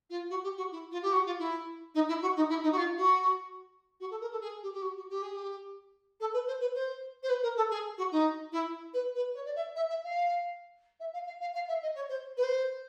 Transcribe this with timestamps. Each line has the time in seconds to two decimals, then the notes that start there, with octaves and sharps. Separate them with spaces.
0.09 F4
0.29 F#4
0.43 G4
0.57 F#4
0.71 E4
0.91 F4
1.02 G4
1.12 F#4
1.26 F4
1.39 E4
1.94 D#4
2.08 E4
2.21 F#4
2.36 D#4
2.49 E4
2.63 D#4
2.72 F#4
2.77 F4
2.97 F#4
4.00 F#4
4.10 A4
4.21 A#4
4.31 A4
4.41 G#4
4.62 G4
4.72 G4
4.82 F#4
4.96 F#4
5.09 G4
5.22 G#4
5.33 G4
6.20 A4
6.33 B4
6.47 C5
6.60 B4
6.74 C5
7.23 C5
7.29 B4
7.42 A#4
7.56 A4
7.70 G#4
7.97 F#4
8.11 D#4
8.52 E4
8.93 B4
9.14 B4
9.34 C#5
9.45 D5
9.55 E5
9.75 E5
9.89 E5
10.03 F5
10.99 E5
11.13 F5
11.26 F5
11.40 F5
11.54 F5
11.68 E5
11.82 D#5
11.95 C#5
12.09 C5
12.37 B4
12.43 C5